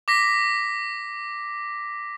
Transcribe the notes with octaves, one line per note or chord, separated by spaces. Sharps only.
D6 A#6 B6